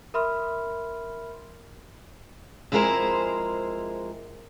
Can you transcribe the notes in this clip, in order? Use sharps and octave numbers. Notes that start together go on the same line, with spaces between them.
A#4 E5 B5 C6 F6
F2 G#3 E4 G#4 A#4 C5